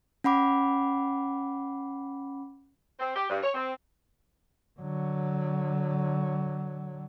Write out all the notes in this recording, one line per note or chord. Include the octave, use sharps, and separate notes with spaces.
C#4 F#5 B5 D6
C4
G4
G2
C#5
C4
D3 F#3